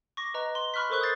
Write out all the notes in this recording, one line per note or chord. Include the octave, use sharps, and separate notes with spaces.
C#6 D6 A#6
B4 D#5 A#5
C6
B5 C#6 F6 F#6 B6
A4 A#4 C5 C#6 F#6
D#6 G6 A6 C7